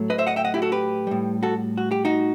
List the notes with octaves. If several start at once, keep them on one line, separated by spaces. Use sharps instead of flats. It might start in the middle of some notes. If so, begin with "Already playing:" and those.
Already playing: A2 F#3 A3
B4 D#5
C5 E5
D#5 F#5
E5 G5
D#5 F#5
E4 G4
F#4 A4
G4 B4
A2 G3
F#4 A4
F#4
G4
D#4 F#4